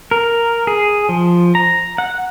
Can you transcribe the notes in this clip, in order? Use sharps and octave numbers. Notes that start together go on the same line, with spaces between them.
A#4
G#4
F3
A#5
F#5